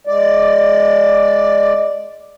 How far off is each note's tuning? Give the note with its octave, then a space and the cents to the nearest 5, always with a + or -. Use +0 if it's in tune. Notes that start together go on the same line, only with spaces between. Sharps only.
G#3 +0 D5 +0